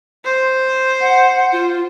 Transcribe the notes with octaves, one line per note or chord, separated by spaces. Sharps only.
C5
F#5
F4